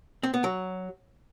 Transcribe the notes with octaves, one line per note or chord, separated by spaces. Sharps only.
C4
B3
F#3